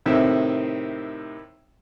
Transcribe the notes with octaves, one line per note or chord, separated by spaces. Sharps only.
A2 C3 D#3 C4 E5